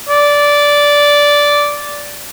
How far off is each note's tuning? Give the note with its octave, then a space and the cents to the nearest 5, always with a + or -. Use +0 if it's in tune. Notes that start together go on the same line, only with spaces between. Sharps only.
D5 -10